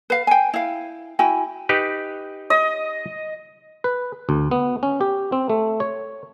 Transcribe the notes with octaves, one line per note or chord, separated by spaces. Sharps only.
B4 F5
G5 G#5
E4 F5
E4 F#4 G5 G#5
D#4 G4 B4
D#5
B4
D2
B3
C#4
G4
C4
A3
C#5